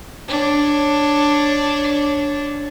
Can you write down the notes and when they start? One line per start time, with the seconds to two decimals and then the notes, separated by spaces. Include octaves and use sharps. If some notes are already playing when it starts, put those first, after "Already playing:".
0.28 D4 C#5